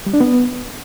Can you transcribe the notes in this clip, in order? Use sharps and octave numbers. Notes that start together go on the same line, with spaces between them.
G3
D4
B3